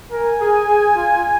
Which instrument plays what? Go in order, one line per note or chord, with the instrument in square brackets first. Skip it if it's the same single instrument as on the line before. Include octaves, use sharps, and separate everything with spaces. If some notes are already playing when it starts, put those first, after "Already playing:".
[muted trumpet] A#4 [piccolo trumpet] G#5
[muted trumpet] G#4
G#4
F4